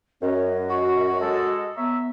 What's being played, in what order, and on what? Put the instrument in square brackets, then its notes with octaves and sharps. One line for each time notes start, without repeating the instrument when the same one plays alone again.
[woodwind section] F#2 [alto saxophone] C#4 [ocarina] D#5
[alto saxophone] F#4 [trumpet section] C#6
[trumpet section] G#3 A4
[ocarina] B3 [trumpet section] C#5 E5 A#5